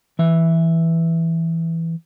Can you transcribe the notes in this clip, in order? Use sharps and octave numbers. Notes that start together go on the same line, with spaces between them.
E3 E5